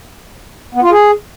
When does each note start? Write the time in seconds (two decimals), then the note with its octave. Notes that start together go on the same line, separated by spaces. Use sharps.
0.75 B3
0.83 F4
0.91 G#4